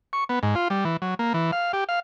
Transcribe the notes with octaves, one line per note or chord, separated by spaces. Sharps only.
C#6
B3
G#2
F4
G3
E3
F#3
A#3
E3
F5
G4
F5